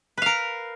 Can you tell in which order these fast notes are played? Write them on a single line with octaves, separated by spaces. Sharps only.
B4 F5 A#4